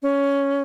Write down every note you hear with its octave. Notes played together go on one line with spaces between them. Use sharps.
C#4